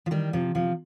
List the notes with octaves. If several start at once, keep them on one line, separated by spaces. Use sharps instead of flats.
F3
D#3 G3
C3 F3
C3 F3